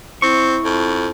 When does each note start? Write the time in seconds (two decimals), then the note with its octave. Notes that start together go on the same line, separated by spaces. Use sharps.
0.22 C4 E4 C#6
0.64 F2